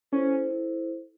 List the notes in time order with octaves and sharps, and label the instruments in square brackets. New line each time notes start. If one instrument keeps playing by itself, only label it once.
[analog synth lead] C#4 [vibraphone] E4 A4 C5
[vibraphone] E4 A4 C5